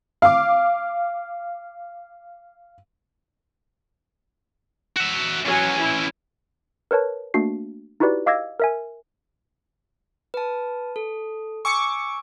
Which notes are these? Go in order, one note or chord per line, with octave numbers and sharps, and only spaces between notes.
F5 D6
F#4 E5
E3 F#3 C#4 G#5
E4
A#4 B4 C#5 A5
A3 A#3 D4 F#4 C7
D#4 E4 F#4 G4 B4 D5
D#5 F5 D6 E6 G#6 A#6
A#4 E5 G#5
B4 A5
A4
G#5 C#6 D6 E6 C#7